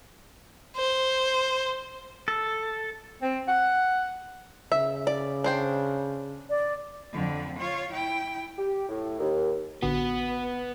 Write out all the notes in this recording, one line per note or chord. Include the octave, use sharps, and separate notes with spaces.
C5
A4
C4
F#5
C#3 E5
D5
D4 C5 G5
D5
F2 D3
F4 C#5
E4 G5
G4
A2
D#2
A1 D3 B3 F#4 B4